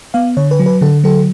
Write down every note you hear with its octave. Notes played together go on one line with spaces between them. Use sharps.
B3 F5
D3 C#5
B4
F#3
B4
D3 A4
F#3 A4